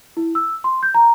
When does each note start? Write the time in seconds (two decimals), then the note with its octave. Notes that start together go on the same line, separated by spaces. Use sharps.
0.17 E4
0.35 E6
0.64 C6
0.83 G6
0.95 A#5